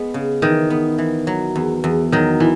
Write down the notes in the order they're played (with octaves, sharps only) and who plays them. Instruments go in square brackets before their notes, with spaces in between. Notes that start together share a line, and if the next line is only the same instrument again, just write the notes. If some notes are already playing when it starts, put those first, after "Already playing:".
Already playing: [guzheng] G#3 B3
C#3
[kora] D#3 [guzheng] E3
[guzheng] B3
E3
F#3
E2
E2
[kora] D#3 [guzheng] F#3
[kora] E3